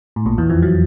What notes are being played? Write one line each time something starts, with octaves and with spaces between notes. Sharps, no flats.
A2
A#1 A#2
E2 E3
F2 F3
F#3